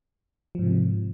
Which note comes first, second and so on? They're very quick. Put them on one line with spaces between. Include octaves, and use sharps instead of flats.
F3 G#2 C3